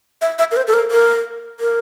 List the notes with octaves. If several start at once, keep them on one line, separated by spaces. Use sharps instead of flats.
E5
E5
A#4
C5
A4
A#4
A#4
A#4